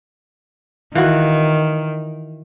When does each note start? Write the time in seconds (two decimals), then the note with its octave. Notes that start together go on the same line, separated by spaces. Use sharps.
0.95 D#3 E3 F4 F#4